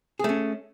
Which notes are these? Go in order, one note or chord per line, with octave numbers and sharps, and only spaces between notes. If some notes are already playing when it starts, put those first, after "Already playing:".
A3 C#4 G#4